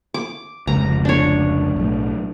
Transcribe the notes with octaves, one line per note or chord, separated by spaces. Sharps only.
D6
F1 C#2 A#5
D4 C#5
B1 A2